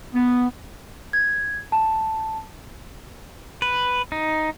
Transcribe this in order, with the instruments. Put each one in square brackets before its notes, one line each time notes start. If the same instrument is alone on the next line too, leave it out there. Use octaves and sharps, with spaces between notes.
[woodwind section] B3
[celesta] G#6
A5
[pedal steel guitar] B4
D#4